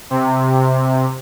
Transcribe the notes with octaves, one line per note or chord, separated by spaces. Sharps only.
C3